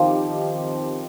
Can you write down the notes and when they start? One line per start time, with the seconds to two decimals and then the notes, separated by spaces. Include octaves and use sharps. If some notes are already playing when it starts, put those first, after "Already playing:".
Already playing: D#3 F3 C4 D#4 G4